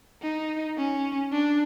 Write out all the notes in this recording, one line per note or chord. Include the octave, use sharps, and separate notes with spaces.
D#4
C#4
D4